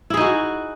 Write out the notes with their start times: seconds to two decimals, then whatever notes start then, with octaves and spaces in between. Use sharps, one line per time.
0.10 E4
0.14 G#4
0.17 D#4
0.21 F#4